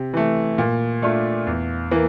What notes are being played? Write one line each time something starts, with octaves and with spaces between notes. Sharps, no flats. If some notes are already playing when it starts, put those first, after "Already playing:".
Already playing: C3
E3 A3
A#2
A3 D4 F4
E2
E3 A#3